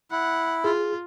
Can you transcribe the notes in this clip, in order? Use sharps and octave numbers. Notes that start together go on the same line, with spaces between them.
E4 F#5
F4 G#4